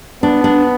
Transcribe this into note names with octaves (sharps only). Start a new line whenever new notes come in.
B3 D4
D4